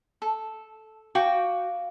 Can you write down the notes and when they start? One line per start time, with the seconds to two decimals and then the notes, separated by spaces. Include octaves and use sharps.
0.22 A4
1.15 F#4 F5 G5 D6